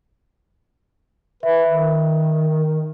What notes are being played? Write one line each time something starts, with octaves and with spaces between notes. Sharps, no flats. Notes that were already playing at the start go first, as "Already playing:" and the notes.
B4 E5
D#3